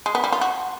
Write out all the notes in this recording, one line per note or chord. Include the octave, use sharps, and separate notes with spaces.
G#3
B3
G3
F4
F#4